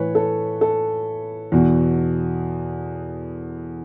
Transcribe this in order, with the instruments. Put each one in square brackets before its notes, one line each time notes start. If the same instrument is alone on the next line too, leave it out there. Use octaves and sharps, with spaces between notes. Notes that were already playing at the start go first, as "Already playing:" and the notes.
Already playing: [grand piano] A2 E3 B4 C#5
A4
A4
E2 B2